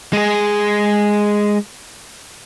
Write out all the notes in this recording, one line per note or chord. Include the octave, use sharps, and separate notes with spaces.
G#3 G#4